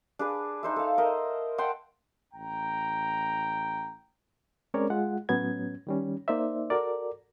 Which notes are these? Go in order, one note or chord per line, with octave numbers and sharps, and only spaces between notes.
D4 G#4 B4
D#4 C5 E5
A4 F5
A#4 D#5 E5
F#5 G5 A5 C6
A1 G5 A#5
G#3 C4 C#4 A#4 C#5 D5
G#3 F4 F#5
A2 F#3 B3 C#4 G#6
D#3 G3 C#4
A#3 D#4 C5 D5 E5
F#4 A4 A#4 D5